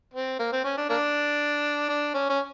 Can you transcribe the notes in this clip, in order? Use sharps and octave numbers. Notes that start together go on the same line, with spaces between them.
C4
A#3
C4
C#4
D4
A#3 D4
D4
C#4
C#4